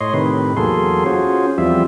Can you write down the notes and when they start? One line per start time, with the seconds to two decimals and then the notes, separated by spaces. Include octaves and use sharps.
0.01 A2 C#5 D#5 C6
0.14 A2 C3 D#3 B4
0.57 E2 F#3 A#3 G#4 A4 C6
1.06 C#4 F4 F#4 G#4 C5
1.58 E2 F3 G3 C4 F4 E5